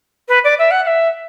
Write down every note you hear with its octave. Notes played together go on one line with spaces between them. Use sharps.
B4
D5
E5
F#5
F#5
E5